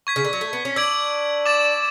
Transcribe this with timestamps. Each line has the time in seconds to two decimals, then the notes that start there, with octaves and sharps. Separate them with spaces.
0.07 C#6 G#6 B6
0.16 C#3
0.24 D3
0.33 F#3
0.41 A3
0.53 B3
0.65 C#4
0.76 D4 E6 G#6 D7 F#7
1.46 D6 A6 E7